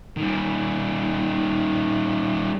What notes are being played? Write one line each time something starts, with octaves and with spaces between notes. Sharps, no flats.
D#3 G3